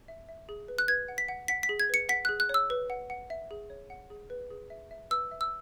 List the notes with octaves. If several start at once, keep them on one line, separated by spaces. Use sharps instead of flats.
E5
E5
G#4
B4
F#6
B4 G#6
F#5
B6
F#5
F#5 B6
B6
G#4
G#6
B4 C#7
F#5 B6
G#4 F#6
F#6
C#5 E6
B4
F#5
F#5
E5
G#4
C#5
F#5
G#4
B4
G#4
E5
E5
B4 E6
E5
E6